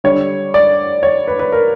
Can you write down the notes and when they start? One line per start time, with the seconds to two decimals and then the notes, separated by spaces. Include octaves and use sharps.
0.04 D3 G3 C#5
0.54 D5
1.03 C#5
1.28 B4
1.39 B4
1.52 A#4